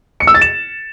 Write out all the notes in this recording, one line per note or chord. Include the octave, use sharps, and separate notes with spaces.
C#7
E6
A6
E7